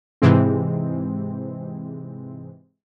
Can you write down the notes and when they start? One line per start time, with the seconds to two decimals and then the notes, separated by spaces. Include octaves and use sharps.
0.22 G#2 C3 E3 G#3 C4